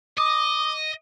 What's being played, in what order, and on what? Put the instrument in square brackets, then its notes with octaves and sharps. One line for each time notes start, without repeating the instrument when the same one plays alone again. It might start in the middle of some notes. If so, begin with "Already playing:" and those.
[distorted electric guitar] D#5 [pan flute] D6 [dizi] D#6